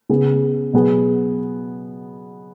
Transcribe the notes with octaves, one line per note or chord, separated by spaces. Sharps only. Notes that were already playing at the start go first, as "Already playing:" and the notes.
C#3 B3 G#4
B2 F#3 B3 G#4